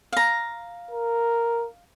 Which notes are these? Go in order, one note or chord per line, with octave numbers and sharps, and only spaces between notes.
F5 A#5
A#4